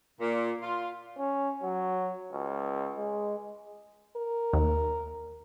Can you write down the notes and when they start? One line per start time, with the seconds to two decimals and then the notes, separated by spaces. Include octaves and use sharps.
0.20 A#2
0.62 F4
1.18 C#4
1.63 F#3
2.32 C#2
2.96 G#3
4.16 A#4
4.53 D#2